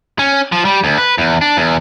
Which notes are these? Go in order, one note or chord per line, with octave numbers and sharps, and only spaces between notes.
C#4
F3
G3
D2
B4
E2
D4
E2